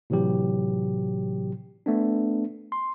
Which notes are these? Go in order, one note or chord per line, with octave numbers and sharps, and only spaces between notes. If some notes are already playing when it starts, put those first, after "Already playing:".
A2 C3 E3 F#3 G4
A3 B3 D4
C6